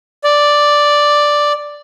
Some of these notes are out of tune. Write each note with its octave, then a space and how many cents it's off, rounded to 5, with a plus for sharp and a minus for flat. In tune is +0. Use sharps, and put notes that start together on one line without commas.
D5 +0